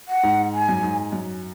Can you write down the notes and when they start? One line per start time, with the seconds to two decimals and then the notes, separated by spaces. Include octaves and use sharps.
0.08 F#5
0.23 G#2
0.53 G#5
0.69 F#2
0.83 G#2
1.12 F#2